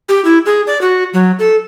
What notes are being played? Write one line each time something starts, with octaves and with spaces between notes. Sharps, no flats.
G4
E4
G#4
D5
F#4
F#3
A4